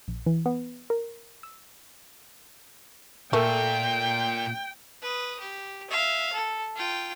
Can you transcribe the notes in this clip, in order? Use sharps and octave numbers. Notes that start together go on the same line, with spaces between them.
A#1
E3
B3
A#4
E6
A#2 A3 A4 A#4 G5 G#5
B4 D#6
G4
E5 F5
A4
F4 G5